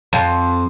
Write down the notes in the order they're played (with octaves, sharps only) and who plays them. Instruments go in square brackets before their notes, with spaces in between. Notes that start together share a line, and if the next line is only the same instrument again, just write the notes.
[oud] F2